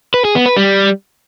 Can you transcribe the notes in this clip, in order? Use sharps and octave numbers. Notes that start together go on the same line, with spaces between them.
B4
G#4
B3
B4
G3